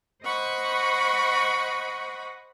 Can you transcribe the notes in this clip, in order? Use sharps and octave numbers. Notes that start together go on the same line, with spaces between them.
C5 D#5 F#5 B5 C#6